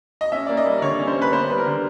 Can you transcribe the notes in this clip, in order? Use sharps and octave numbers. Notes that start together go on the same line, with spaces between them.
D#5
C#4 E5
A#3 D5
D#5
G3
D5
D3 C#5
C#4
C5
A#3
B4
B3 C5
G3 B4
A#4
D3